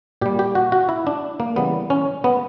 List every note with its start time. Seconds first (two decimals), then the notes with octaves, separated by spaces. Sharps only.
0.21 A#2 G3 G4
0.39 G4
0.55 F#4
0.72 F#4
0.89 E4
1.07 D4
1.40 A#3
1.56 C#3 E3 G3 B3
1.90 C#4
2.24 B3